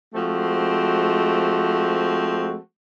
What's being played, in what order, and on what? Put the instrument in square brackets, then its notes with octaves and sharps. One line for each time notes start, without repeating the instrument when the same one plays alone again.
[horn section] F3 G#3 A3 C4 F#4